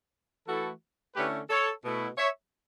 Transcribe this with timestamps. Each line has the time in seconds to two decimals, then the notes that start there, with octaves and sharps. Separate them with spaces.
0.47 E3 A3 E4 F#4 A4
1.15 D3 A3 C#4 E4 G4 B4
1.50 A4 C#5
1.84 B2 A3 E4
2.18 C#5 E5